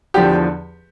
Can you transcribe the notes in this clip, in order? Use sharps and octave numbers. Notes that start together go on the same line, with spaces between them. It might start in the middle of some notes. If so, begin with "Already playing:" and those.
E2 D3 F3 G4